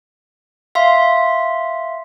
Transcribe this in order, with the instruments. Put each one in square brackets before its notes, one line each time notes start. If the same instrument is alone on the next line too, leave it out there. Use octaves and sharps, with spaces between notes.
[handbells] E5 F5 C6